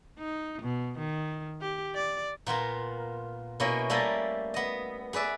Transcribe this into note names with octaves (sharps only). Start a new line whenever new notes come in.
D#4
B2
D#3
G4
D5
A#2 B3 F4 A#4
B2 A#3 C#4 E4 C#5
G3 A3 A#3 A4 G#5 A#5
B3 D#5
G#4 B4 D5 E5